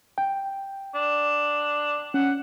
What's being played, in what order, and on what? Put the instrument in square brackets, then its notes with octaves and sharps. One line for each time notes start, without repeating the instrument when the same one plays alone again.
[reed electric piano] G5
[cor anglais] D4
[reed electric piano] C#4 [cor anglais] F#5